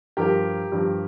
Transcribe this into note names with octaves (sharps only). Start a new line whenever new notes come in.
G2 F3 G4 A#4
G2 F3